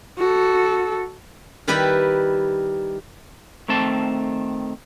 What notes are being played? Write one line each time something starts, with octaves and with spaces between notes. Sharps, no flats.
F#4 A4
D#3 G3 E4 G4 B4
D#3 A3 C4 A4 A5